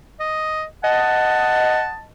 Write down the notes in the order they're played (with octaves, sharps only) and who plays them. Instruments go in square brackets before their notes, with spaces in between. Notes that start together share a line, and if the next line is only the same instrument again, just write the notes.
[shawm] D#5
[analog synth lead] D#5 [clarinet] F#5 [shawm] A5